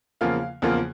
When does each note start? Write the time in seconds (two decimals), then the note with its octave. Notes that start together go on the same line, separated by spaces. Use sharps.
0.21 E2 C#3 F3 A#3 F4 F5
0.62 E2 C#3 F3 A#3 F4